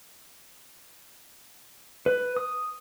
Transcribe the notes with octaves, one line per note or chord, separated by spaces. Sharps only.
B4
D#6